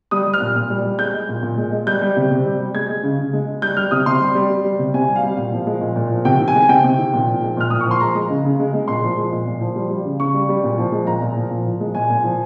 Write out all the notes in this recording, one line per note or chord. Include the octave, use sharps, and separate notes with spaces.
G3 D#6
G3
F6
A#2
A#2
G3
G3
G#3 G6
G#3
A#2
A#2
G#3
G#3
G3 G6
G3
C3
C3
G3
G3
G#3 G#6
G#3
C#3
C#3
G#3
G#3
G3 G6
G3 F6
C3 D#6
C3 C6
G3
G3
G3
G3
C3
C3 G#5
G3
F5
G3
A#2 F5
F3
G#3
A#2
A#2
F3
C3 G5
D#3
G#5
G#3
C3 G5
C3
D#3
A#2
F3
G#3
A#2 F6
A#2 D#6
C#6
F3
C6
G#3 A#5
G#3
C#3
C#3
G#3
G#3
A#2 C6
F3
G#3
A#2
A#2
F3
G3
G3
C#3
C#3 C#6
G3
G3
A#2
F3
G#3
A#2 A#5
A#2
F3
A#2
F3
G#3
A#2 G#5
A#2
F3